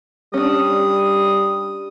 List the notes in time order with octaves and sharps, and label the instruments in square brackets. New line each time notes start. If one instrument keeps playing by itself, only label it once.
[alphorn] G3 [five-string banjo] C#4 D4 [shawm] D#6